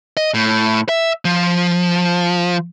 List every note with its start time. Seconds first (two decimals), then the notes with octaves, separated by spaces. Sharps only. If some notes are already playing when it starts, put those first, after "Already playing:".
0.17 D#5
0.34 A2
0.89 E5
1.25 F3